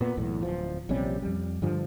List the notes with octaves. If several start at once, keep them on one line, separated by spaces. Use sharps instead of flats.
A#2 B3
B1 E2 A2
D1 F3
A#1 C3 G3 C#4
F2 G3
G2 D3 F3